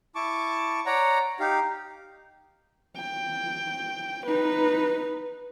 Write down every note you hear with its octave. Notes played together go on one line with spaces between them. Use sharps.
E4 A5 C#6 D6
C#5 D5 F#5 A#5
D#4 G4 F5
G5
D#4 B4